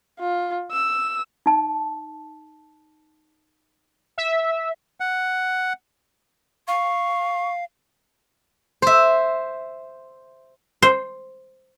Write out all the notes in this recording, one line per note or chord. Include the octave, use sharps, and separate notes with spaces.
F4
E6
D#4 A5
E5
F#5
F5 C#6
C5 E5
C5